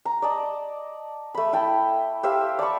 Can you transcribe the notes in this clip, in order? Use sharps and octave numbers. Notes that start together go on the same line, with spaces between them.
A#5
D5 D#5 A5
A3 B5
E4 G5 A5
G4 C5 E5 F5
D5 A5 B5 C#6